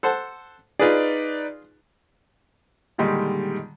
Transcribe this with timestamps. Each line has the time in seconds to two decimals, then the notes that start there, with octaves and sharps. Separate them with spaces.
0.03 A4 C5 F#5
0.79 D#4 F4 G#4 B4 D5
2.98 A#2 D3 D#3 G3 G#3